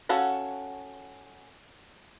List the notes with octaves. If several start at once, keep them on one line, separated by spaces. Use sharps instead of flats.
C#4 F#4 A4 F5 F#5